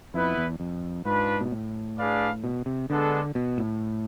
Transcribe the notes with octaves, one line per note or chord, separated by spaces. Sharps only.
F2 B3 E4 B4
E2
F2
G#2 D4 F4 B4
B2
A2
D4 G#4 B4 D5 F5
B2
C3
D3 G#3 B3 D4 A4
B2
A2